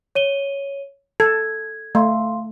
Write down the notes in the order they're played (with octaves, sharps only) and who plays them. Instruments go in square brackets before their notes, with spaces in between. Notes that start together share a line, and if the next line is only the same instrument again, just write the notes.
[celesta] C#5 D#7 G7
[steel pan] A4 [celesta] G#6
[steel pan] A3 [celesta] F5 C6